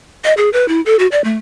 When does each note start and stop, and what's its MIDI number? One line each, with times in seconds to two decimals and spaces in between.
0.24 0.34 75
0.37 0.50 68
0.53 0.68 71
0.68 0.81 64
0.86 0.96 69
0.99 1.07 66
1.12 1.23 74
1.24 1.37 57